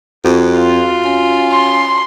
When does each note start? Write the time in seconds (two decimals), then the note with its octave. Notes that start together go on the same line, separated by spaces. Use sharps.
0.25 F2 F#4
0.57 F4
1.04 C#4
1.52 C6